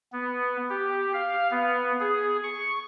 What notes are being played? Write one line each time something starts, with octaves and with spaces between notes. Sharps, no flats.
B3
G4
F5
B3
G#4
C#6